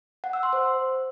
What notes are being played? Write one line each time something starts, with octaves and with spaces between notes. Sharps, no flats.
F#5
E6
C6
C5